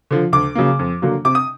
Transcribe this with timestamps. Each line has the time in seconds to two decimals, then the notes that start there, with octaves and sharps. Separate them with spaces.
0.11 D3 F3
0.32 D2 D6
0.55 C#3 F#3 A#3
0.79 F2
1.02 D3 F#3 A#3
1.25 C3 D6
1.35 D#6